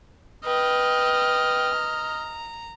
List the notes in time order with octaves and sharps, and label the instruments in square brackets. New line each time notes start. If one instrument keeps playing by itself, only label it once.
[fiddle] B4 G5 [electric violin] D#5 F6
[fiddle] A#5